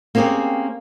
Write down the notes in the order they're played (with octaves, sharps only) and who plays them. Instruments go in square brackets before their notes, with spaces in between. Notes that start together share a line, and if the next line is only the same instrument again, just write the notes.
[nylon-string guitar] A#3 C4 C#4 G4 G#4